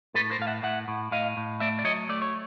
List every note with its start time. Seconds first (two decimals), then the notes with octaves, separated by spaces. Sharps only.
0.14 A2 A4 B4
0.31 A#4 C5
0.39 A2 F5
0.47 E5 F#5
0.63 A2 E5 F#5
0.88 A2
1.11 A2 D#5 F5
1.37 A2
1.60 A3 D5 E5
1.79 D5
1.84 F#3 C#5 D#5
2.09 A3 D5
2.22 C#5